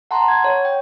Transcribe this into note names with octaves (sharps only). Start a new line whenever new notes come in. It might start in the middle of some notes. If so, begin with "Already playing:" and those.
F#5 A5 A#5 C6
F#5 G#6
C#5
G5